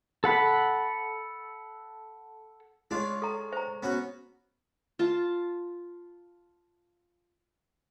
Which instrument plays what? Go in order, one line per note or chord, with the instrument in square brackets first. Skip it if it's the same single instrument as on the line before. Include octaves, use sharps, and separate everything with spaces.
[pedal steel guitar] A4 F#5 B5
[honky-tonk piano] G#3 C#5 [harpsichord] D4 F4
[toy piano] A4 A#5
C5 A#5
[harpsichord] B3 C#4 F#4
[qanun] F4 A5